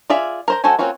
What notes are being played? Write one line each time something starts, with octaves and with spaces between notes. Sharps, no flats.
F4 G#4 D5 E5 F5
A#4 C5 A#5
G#3 F#4 A4 C5 G#5
A#3 C4 C#4 F4 F#4